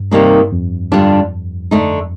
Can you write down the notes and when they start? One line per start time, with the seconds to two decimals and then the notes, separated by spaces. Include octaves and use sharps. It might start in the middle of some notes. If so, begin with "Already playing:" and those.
Already playing: G2
0.11 C3 D#3 G3 A#3 D#4
0.52 F2
0.92 G2 D3 G3 D4 F4
1.71 D3 A3 D#4